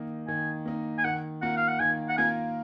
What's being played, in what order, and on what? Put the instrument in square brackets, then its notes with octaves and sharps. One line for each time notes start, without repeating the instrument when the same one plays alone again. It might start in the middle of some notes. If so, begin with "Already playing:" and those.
Already playing: [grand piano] D#3 A#3 D#4
[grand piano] D#3 [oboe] G#5
[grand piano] A#3 D#4
[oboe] G#5
[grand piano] D#3 [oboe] F#5
[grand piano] A#3 F4 A#4 [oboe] F#5
[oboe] F5
F#5
[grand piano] D#3 [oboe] G#5
[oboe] F#5
[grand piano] A#3 F4 A#4 [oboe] G#5